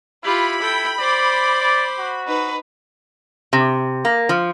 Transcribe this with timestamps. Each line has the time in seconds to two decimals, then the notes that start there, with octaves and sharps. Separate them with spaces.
0.24 E4 F4 G4 B5
0.61 A4 G5
0.99 C5 D5 D6
1.60 D5
1.98 F#4
2.27 D#4 B4
3.53 C3
4.05 A#3
4.29 F3